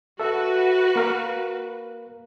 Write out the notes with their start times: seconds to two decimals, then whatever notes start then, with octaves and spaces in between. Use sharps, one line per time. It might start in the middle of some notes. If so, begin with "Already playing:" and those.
0.20 F#4 A4 B4 E5
0.96 A#3 A#4 F5